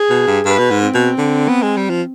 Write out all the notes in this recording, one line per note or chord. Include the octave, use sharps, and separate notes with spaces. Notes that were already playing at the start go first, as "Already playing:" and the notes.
Already playing: G#4
B2
G2
G2 B4
B2
G#2
C4
B2
D3
B3
G#3
G3
F3